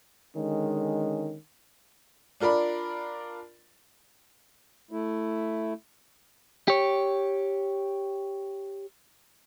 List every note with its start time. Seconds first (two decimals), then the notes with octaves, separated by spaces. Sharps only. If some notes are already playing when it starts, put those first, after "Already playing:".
0.35 D3 D#3 G#3 C#4
2.40 D4 F4 A#4 D5 B5
4.91 A3 E4
6.68 G4 C#5